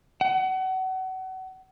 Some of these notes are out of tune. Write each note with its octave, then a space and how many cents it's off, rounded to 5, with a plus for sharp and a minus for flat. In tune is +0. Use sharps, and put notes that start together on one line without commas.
F#5 +30